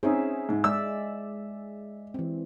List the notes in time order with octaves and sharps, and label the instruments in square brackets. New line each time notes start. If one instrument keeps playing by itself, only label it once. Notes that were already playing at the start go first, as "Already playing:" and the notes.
[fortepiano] C4 C#4 D#4 [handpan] G#4 E5
[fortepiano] G#2
[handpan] G#3 D5 E5 [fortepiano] E6
[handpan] E3 C4